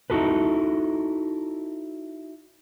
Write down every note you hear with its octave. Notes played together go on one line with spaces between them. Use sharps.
D#4 E4 F#4 G4 A4 B4